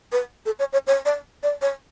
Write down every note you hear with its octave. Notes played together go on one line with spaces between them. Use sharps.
B4
A4
C#5
C#5
C#5
D5
D5
C#5